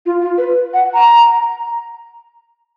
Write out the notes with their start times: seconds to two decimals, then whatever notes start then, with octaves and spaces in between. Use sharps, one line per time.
0.06 F4
0.22 F4
0.38 B4
0.74 F#5
0.94 A#5